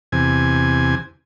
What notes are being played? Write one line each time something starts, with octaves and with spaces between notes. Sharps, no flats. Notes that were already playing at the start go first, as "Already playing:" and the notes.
E2 C3 G#5